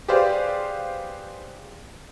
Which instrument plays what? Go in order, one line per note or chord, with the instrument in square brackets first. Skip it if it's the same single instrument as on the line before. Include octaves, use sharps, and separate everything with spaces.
[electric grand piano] G4 G#4 B4 C5 D5 F5